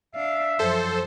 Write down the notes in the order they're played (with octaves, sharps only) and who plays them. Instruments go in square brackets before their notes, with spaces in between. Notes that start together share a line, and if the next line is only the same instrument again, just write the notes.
[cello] D4 F5 [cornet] E5
[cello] F#2 F3 [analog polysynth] A4 C5